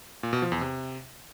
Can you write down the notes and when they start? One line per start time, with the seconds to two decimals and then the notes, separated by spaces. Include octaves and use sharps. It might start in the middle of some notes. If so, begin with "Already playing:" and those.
0.23 A#2
0.33 B2
0.42 F3
0.52 E2
0.61 C3